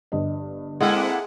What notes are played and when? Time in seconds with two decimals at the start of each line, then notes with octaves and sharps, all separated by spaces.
0.12 G1 G2 D#5
0.80 G#3 A#3 C4 E4 A4 F#5